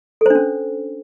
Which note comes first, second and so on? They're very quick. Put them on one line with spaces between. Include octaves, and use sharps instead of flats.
A4 C5 D4 C#4